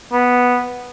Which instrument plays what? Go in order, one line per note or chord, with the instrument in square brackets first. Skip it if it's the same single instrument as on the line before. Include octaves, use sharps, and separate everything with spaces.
[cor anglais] B3